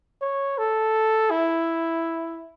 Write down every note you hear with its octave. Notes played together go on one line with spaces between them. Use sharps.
C#5
A4
E4